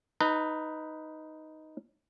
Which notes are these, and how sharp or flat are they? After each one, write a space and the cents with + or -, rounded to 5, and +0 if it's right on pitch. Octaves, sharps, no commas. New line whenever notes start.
D#4 +5 B4 +0 A#5 -30